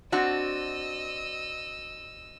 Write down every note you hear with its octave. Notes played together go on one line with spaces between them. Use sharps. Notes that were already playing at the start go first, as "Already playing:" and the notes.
C4 D4 F#4 D#5 F#5 E6